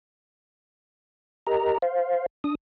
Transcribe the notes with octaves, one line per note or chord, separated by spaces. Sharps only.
G4 A#4 D#5 A#5
C5 F5
D4 D#6